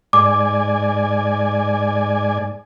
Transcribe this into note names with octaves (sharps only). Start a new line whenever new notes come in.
G#2 D5 G#5 D6